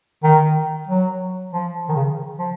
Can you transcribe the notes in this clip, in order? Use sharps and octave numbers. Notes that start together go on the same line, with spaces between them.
D#3
F#3
F3
D#3
C#3
F3